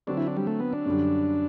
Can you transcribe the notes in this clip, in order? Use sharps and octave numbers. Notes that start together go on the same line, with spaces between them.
D3 F#3 C4 D4
E4
D4
G3
A3
B3
D4
F#2 D3 G3